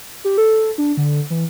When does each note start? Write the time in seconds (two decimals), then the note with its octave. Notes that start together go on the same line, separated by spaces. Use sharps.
0.24 G4
0.38 A4
0.78 D4
0.97 D3
1.30 E3